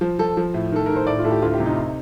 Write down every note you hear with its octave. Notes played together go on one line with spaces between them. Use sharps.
F3
F3 A4
F3
A2
D#3 A4
D#3 A#4
C5
A2 D5
F4
A2 A4
G4
D2 F4
G4
C3
D#4